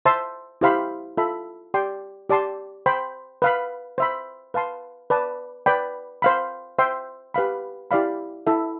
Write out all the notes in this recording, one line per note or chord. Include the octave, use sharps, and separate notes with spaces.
C5 E5 A5 C6
E4 G4 C5 F5 B5
F4 A4 E5 B5
G4 D5 G5 C6
G4 D5 A5 C6
C5 G5 B5
B4 F5 B5
C5 E5 B5
B4 F5 A5 C6
B4 D5 A5
B4 D5 G5 B5
C5 F5 B5
C5 E5 G5 C6
G4 B4 F5 B5
E4 G4 D5 F5 B5
E4 A4 E5